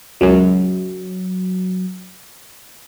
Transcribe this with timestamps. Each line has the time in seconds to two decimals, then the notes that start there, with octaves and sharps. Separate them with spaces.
0.21 C#2 F#2 F#3